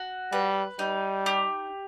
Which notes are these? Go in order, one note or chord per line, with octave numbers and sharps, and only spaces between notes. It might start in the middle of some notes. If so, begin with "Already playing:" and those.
Already playing: F#4
G3 B4
G3 D#4
G4